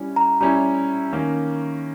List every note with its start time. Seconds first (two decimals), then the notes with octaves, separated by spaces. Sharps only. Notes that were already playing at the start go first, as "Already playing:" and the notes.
Already playing: G3 C#4 E4
0.16 A#5
0.41 G3 C#4 E4 A#5
1.13 D#3 A#3 C#4